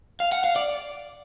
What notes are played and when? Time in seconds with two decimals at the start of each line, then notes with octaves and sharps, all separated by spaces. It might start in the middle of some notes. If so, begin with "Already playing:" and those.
0.20 F5
0.32 F#5
0.44 F5
0.56 D5